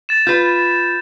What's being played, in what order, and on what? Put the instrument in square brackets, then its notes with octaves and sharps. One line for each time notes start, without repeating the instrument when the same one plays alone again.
[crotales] A6 E7
[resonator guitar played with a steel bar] F4 B4 [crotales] G6